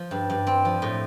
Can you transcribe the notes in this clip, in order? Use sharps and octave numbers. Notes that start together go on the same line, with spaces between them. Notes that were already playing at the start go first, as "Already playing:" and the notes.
Already playing: F3
G2
G2
C4
F3
A2